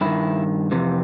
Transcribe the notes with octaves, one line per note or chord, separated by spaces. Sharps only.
G2 D#3 E4
F2 C3 E3